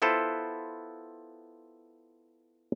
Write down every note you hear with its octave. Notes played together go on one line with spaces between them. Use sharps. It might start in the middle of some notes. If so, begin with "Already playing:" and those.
B3 E4 F4 A4 B4 C5